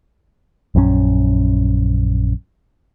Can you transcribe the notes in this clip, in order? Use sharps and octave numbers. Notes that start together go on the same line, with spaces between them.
A#1 F#2 D3 C#4